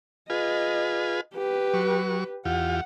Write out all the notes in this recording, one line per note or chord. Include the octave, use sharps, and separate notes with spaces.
F4 G#4 B4 D#5
G4 B4
F#3 C#6
E2 F4 G4 F#5